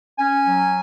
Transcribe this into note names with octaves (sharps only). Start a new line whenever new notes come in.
C#4 G#5
F#3